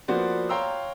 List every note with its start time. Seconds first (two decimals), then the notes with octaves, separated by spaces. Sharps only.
0.08 F3 A#3 B3 F#4 C5 D5
0.49 C#5 F5 G5 A#5 C6 E6